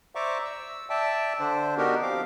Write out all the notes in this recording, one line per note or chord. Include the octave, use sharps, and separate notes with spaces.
C5 D5 E5 A#5 C#6 D6
E6
D5 E5 G5 A5
D3 D4 C5
B3 D4 D#4 F#4 G4 A#4
F3 C4 F5 D6